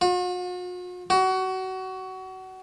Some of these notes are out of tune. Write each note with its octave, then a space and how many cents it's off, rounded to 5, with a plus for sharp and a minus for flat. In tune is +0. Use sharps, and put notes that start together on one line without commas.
F#4 -45
F#4 +25